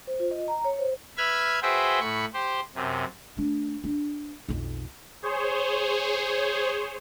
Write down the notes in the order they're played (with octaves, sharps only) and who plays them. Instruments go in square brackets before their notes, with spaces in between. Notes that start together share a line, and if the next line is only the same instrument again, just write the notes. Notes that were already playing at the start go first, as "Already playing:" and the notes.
[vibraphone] C5
F4
D#5
A#5
C#5
C5
[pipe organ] B4 E5 B5 F6 G#6
F#4 G#4 B4 C5 E5 G5
A2 B5 C#6
G4 C5
F#2 C3
[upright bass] A3 D4
D4
B1 F2
[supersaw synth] G#4 C5 C#5